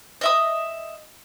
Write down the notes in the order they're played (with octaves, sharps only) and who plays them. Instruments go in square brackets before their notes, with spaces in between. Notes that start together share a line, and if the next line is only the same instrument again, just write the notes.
[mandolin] D#5 E5 D#6